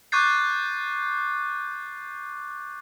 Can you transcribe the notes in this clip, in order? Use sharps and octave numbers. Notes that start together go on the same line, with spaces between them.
C#6 D6 F#6 G6 A6 C7